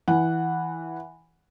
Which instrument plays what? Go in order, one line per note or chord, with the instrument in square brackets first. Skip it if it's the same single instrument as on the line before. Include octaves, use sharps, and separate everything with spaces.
[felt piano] E3 F#5